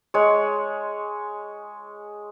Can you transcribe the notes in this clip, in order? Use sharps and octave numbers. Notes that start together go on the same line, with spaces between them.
G#3 C#5